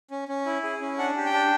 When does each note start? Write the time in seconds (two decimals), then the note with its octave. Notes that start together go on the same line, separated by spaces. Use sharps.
0.11 C#4
0.28 C#4
0.46 E4
0.63 G#4
0.81 C#4
0.98 D4 F#5
1.17 G4
1.25 G5
1.33 D4